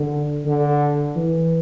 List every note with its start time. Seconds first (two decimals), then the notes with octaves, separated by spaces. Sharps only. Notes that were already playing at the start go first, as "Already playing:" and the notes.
Already playing: D3
0.46 D3
1.16 E3